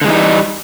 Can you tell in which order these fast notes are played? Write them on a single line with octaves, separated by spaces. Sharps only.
D3 G#3 E3 D#4 G3